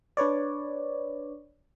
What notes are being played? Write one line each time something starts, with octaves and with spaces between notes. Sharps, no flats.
D4 B4 C#5 D5